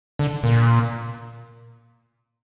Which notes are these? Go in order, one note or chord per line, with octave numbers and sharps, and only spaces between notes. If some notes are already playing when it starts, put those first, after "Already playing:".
D3
A#2